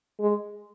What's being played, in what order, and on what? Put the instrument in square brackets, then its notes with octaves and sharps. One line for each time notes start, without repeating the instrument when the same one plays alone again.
[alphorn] G#3